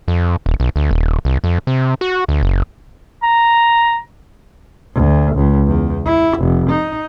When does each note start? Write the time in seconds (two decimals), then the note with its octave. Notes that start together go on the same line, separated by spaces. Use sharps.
0.08 F2
0.46 D#1
0.60 B1
0.76 D2
0.91 D#1
1.25 C2
1.44 F2
1.67 C3
2.01 F#4
2.29 D2
2.42 F#1
3.23 A#5
4.95 D2
5.36 C#2
5.67 E2
6.05 E4
6.38 F1
6.70 D#4